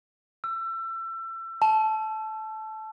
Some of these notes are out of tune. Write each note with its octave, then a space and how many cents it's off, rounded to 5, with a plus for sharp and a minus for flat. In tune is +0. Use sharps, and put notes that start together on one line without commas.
E6 +30
A5 -15